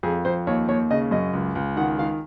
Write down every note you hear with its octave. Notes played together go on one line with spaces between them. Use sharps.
F2 G#4
F2 C5
D#2 C#5
D#2 C#5
C#3 D#5
F#2 D#5
C#2
C#2
D#3 F#5
D#3 F5